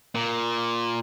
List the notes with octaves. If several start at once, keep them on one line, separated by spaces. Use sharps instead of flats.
A#2